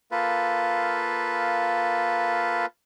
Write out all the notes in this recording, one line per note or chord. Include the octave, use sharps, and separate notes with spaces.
A#3 F4 A4 B4